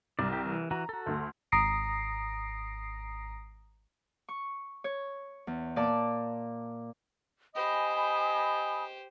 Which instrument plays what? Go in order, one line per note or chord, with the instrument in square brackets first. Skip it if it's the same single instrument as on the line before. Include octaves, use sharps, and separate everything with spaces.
[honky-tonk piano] C2 [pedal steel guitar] D5
[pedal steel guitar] G4
E3
[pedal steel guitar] E3 F#4 [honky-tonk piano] A#5
[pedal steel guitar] F#4 A4
[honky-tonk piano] D2 A3
[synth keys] G#1 A#5 D#6 A#6 C7 D7
[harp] C#6
C#5
E2
A#2 D5 A5 D6
[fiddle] G4 C5 [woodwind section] D#5 [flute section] G#5 B5 [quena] D#6